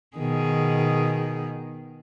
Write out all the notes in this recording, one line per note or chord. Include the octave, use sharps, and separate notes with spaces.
B2 D#3 G#4